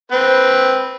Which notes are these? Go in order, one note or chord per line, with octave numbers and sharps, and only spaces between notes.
C4 B4